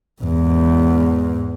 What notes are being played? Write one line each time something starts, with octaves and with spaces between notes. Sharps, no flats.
E2 G#2